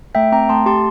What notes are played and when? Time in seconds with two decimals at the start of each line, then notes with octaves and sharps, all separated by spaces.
0.15 A3 E5 G5
0.32 C4 G5 A#5
0.49 A3 A5 C6
0.66 G4 A5 C6